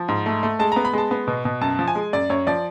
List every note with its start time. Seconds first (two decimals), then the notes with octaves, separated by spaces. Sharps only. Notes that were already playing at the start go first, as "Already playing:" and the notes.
Already playing: F3
0.08 G#2
0.26 A3
0.43 A3
0.59 G#3 A5
0.72 B3 A#5
0.85 B5
0.93 G#3 A5
1.11 B3
1.28 B2
1.45 B2
1.61 F#2 A5
1.79 F3
1.88 G#5
1.95 G#3
2.13 F#2 D5
2.30 F#2 C#5
2.47 F3 D5